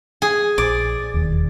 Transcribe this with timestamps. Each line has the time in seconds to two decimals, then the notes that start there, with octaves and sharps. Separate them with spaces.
0.22 G#4
0.58 A#1 D5
1.14 E1 D#2